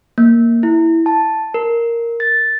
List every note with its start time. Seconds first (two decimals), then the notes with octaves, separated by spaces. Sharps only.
0.18 A#3
0.63 E4
1.06 A5
1.54 A#4
2.20 A6